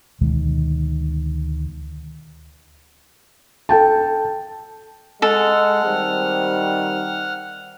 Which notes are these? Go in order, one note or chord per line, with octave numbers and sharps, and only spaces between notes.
D2 B2 D#3 G#3
A4 G5 A5
G#3 A4 F#5 F6
D#3 G3 C4